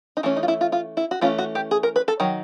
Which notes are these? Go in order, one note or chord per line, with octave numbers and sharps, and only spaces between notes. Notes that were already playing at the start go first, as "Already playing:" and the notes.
D#4
E3 A3 C#4 E4
D#4
F4
E4
F4
F4
E4
F#4
E3 A3 C#4 F4
F#4
G4
G#4
A#4
B4
A4
D#3 F#3